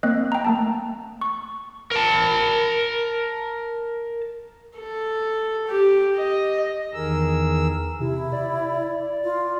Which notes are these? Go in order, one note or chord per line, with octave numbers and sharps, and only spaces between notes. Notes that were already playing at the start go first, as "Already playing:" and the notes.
A#3 C4 D#5 F#6
G5 A#5
A3 A#3 A5
C#6
A#4 A5
A4
G4
D#5
E2 D#3 G#4 A#4 E6
C3 E4
D5
F4